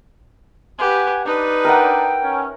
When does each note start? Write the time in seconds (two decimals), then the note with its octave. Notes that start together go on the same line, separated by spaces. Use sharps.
0.79 G4 B4 F#5 G#5
1.25 D4 D#4 B4
1.64 A#4 E5 F#5 G5
2.23 C#4